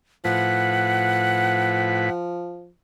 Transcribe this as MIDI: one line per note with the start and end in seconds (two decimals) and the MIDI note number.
0.25 2.10 45
0.25 2.69 53
0.25 2.10 71
0.25 2.10 78